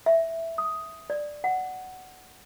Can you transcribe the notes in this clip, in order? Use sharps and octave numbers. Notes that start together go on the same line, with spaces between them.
E5
D#6
D5
F#5